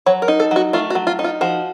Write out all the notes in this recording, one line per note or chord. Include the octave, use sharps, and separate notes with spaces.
F#3 C#5
A#4
D#4
A4
F#3 F#4
A3 F4
F#4
F#3
F4
D#4
F4
F3 F#4